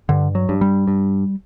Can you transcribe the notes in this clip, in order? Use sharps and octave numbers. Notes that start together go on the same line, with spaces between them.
G2 D3
F#3
G2
G3
G2